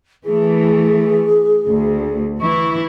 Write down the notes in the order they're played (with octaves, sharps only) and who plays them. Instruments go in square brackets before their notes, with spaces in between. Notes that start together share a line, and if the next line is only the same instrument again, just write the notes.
[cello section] E3 A3 [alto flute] G#4
[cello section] D2
[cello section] E3 E4 [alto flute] C#6